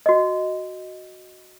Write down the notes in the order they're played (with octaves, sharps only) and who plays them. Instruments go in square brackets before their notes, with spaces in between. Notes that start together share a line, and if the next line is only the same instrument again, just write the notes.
[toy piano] F#4 D#5